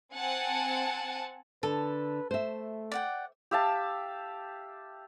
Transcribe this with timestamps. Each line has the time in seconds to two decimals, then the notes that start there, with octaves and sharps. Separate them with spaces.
0.16 C4 F#5 G#5 A5
1.63 D3 A4 B4
2.31 A3 C5 E5
2.92 D5 F#5 G5
3.51 G4 E5 F5 A5